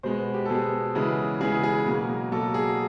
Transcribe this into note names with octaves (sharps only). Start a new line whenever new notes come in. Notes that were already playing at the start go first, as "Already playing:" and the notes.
B2 G#3 B3 C5
G4
A4
B2 G#3 B3 G#4
C#3 E3 G#3 B3
C#3 E3 G#3 B3 G#4
G#4
B2 F#3 A#3
B2 F#3 A#3 A4
G#4